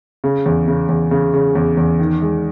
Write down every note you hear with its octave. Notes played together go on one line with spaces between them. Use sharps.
C#3
E2
C#3
E2
C#3
C#3
E2
E2
D#3
G#3